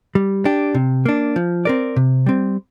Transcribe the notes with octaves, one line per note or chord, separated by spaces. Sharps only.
G3
D4 G4
C3
A#3 D4
F3
C4 A#4 D5
C3
G3 C4